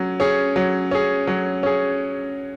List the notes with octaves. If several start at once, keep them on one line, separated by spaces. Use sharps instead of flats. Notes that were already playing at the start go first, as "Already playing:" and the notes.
Already playing: F#3 C#4
C#4 G#4
F#3
C#4 G#4
F#3
C#4 G#4